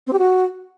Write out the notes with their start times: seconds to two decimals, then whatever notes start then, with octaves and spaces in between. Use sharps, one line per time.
0.07 C4
0.13 G4
0.19 F#4